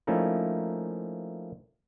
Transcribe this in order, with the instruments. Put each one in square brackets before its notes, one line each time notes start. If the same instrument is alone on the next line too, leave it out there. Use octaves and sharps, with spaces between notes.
[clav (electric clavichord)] F3 A3 A#3 C#4 D#4 E4